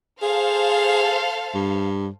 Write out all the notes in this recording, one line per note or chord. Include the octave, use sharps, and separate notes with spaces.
G#4 A4 C5 F5
G2